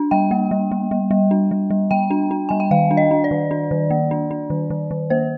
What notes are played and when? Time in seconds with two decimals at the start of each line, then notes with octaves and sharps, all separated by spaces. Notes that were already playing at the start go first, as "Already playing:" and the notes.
Already playing: D4
0.11 G3 G5
0.31 A#3
0.51 G3
0.71 G3
0.91 G3
1.11 G3
1.31 D4
1.51 G3
1.70 G3
1.91 G3 G5
2.11 D4
2.31 D4
2.49 G3 G#5
2.60 G5
2.71 D#3 F5
2.91 D4
2.97 D#5
3.11 D4
3.24 D5
3.31 D#3
3.51 D4
3.71 D#3
3.90 A#3
4.11 D4
4.31 D4
4.50 D#3
4.70 D#3
4.91 D#3
5.10 A#3 C5